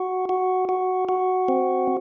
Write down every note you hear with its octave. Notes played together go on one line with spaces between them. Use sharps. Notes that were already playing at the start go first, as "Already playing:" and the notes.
Already playing: F#4
F#4
F#4
F#4
C4